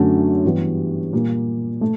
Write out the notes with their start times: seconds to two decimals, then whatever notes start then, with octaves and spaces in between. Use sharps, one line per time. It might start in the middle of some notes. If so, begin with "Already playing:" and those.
Already playing: F#2 D3 F#3 A3 C#4
0.45 G2 E3 G3 B3
1.13 A#2 G3 A#3
1.81 A3